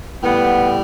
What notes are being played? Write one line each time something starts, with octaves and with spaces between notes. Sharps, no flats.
A2 G3 B3